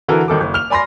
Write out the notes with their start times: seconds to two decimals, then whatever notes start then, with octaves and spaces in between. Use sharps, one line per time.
0.08 D3 E3 F#4 A4 A#4
0.28 G#1 D#3 A4 D6
0.40 F#1
0.54 F6 F7
0.70 D5 G#5 B5 C6 A#6